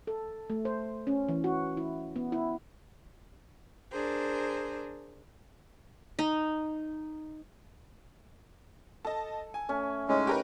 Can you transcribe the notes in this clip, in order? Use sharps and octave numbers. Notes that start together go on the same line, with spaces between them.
A4
A3
C5
C#4
E3
F#4
E4
B3
E4
D4 G#4 A#4 C5
D#4
A4 D#5 A5
G#5
A3 C#4
A2 C#3 G#3 C#4 D#4
G4 A#4 B4 C#6